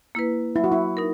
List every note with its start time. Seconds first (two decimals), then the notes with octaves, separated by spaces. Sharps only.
0.15 A#3 E4 B4
0.56 F#3 E4
0.64 F#4
0.72 E4
0.97 D#4 A#4